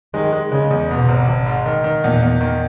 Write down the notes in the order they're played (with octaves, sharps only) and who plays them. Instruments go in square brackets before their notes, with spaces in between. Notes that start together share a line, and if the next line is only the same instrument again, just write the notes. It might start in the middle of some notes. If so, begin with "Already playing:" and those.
[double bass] D#3 [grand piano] G#3
[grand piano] G#3
[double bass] C#3 [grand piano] G#3
[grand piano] E2
[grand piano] G#2 [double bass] B2
[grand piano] G#1
G#1
G#2
D#3
D#3
[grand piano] E2 [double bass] A#2
[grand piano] E2
D#3